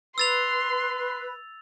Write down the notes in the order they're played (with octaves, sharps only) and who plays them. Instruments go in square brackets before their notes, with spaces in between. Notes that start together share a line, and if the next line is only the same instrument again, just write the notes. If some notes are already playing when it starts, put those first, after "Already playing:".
[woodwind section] B4 [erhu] C6 [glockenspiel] E6 A6 F7